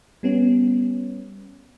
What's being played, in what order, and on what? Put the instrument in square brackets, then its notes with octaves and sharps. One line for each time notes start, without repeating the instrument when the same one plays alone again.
[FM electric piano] G3 B3 C#4